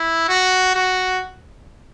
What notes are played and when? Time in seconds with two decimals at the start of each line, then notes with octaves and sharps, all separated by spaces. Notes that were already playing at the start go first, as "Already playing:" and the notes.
Already playing: E4
0.29 F#4
0.75 F#4